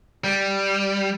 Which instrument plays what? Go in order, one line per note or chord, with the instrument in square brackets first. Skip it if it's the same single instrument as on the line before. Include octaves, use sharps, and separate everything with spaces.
[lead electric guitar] G3